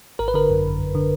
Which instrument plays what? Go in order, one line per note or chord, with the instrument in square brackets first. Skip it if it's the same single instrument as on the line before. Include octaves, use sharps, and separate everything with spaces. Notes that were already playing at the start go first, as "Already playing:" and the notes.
[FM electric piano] G#1 A#4
B4
D3 A#4
F#2
G#1
G#1
D3